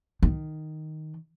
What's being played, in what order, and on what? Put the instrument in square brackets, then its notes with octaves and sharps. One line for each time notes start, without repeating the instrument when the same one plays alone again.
[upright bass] D#3